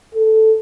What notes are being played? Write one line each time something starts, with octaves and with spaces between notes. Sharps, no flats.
A4